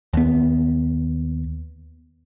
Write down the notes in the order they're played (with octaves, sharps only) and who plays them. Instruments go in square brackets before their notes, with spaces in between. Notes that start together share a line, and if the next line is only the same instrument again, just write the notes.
[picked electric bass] D#2 B3